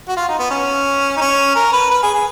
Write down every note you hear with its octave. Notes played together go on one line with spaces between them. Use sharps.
F#4
F4
D#4
B3
C#4
D#4
C#4
A#4
B4
B4
G#4
G#4